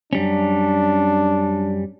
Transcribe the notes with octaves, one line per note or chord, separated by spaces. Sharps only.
F#2 G3 C#4 D4